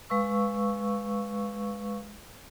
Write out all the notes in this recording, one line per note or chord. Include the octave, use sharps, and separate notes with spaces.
G#3 B4 F5 C#6 E6